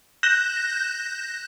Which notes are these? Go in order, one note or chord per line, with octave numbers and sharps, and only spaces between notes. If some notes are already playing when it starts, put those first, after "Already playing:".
F#6 G6 A#6 E7